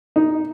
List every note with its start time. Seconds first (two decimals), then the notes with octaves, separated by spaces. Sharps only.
0.16 D#4